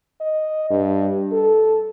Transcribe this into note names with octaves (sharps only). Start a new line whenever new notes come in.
D#5
G2
A4